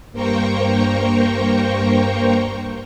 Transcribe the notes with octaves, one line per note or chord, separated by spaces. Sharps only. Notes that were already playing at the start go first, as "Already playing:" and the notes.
G2 A#3 C5 G5 A#5 C#6